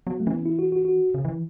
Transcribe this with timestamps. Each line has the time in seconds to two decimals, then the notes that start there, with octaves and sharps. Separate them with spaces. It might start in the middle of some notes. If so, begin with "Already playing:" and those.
0.07 F#3 B3
0.20 A3
0.27 E3 C#4
0.33 B3
0.46 E4
0.59 F#4
0.72 F#4
0.85 F#4
1.14 C#3
1.25 E3